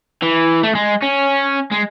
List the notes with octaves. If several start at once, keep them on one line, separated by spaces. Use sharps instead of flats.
E3
A3
G#3
C#4
G#3